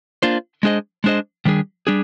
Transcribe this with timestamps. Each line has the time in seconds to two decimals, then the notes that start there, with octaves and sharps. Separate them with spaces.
0.23 A#3 D4 F4 C5
0.63 G#3 D4 G#4 C5 D#5
1.04 G#3 D4 G#4 C5 D#5
1.45 D#3 G3 D4 G#4
1.87 G3 D4 G#4